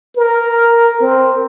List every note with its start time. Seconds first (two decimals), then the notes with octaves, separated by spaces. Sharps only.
0.16 A#4
1.01 C4